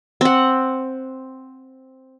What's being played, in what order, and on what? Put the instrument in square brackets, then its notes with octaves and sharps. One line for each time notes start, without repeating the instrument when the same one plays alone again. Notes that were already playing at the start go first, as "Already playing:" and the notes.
[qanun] C4 F#5